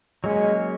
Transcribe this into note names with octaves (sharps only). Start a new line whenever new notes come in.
F#3 G#3 A#3 C#4